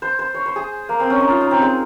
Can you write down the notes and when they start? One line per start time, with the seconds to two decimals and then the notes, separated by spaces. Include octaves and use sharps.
0.02 C5
0.19 C5
0.34 C#5
0.46 C5
0.56 G#4
0.89 A#3
1.00 C4
1.10 C#4
1.20 D#4
1.30 F4
1.41 D#4
1.51 C4
1.62 G#3